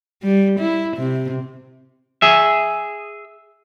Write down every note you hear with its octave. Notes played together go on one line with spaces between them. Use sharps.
G3
E4
C3
G#4 E5